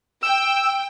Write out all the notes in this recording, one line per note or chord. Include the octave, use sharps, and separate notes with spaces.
G5 E6